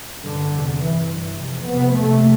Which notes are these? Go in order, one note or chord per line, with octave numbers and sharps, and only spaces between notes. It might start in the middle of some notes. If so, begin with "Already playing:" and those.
G2 D3
E2 C3
G2 E3
G2
F2 C3
F2 C3 B3
F2 C3 A3